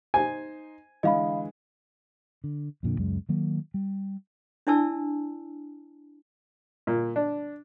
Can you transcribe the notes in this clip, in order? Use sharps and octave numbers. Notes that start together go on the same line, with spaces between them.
D#4 C5 G#5
D3 E3 G#3 D#5 F5 B5
D3
F2 A#2 D3
C#2 F#2 G#3
D#3 F#3 A#3
G3
D4 E4 D5 G#5 A5 E6
A#2
D4